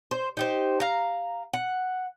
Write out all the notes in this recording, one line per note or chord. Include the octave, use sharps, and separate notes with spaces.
C5
D#4 G4 C5
F5 A#5
F#5